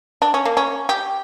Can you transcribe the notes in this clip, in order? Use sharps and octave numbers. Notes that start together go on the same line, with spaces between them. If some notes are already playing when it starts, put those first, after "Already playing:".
D4
C#4
A#3
C#4
G4